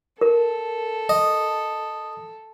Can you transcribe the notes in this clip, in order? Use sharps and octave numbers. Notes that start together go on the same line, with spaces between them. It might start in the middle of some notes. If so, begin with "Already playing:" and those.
A4 A#4
D#5